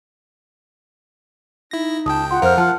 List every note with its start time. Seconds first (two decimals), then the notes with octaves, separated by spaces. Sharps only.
1.71 D#4 E4 A#6
2.06 C#2 G5 A5 D#6
2.31 F4 F#5 C6
2.42 F2 A#4 C5 F5 F6
2.58 F3 F4 A5 F6